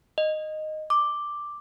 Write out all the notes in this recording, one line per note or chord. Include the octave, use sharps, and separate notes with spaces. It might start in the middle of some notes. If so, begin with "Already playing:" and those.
D#5
D6